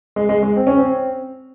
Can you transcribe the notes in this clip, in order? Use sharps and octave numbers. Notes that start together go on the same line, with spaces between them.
G#3
G#3
G#3
C4
C#4
C4